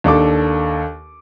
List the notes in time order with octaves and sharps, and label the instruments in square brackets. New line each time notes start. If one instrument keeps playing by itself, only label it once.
[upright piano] D#2 D4 A4 D6